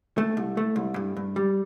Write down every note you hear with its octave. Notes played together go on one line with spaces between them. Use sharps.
A3
C2
A3
C2
G2
G2
G3